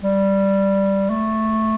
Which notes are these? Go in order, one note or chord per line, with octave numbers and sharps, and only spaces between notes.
G3
A3